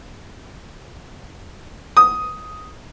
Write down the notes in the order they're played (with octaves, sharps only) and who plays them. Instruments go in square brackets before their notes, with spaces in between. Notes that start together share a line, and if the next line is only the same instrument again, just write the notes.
[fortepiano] D#6